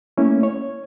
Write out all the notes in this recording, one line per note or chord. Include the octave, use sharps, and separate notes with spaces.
A3 A#3 C#4 E4
C#5